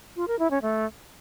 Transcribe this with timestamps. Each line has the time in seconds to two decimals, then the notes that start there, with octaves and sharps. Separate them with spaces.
0.16 F4
0.28 A#4
0.39 E4
0.51 C#4
0.62 A3